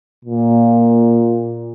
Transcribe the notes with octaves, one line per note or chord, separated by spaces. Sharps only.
A#2